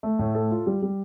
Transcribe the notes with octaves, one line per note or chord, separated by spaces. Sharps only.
A3
A2
A4
F4
G3
G3